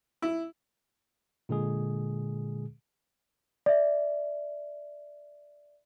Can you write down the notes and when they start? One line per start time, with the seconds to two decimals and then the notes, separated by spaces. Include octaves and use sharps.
0.22 E4
1.49 A#2 D3 G#3 G#4
3.66 D5 E5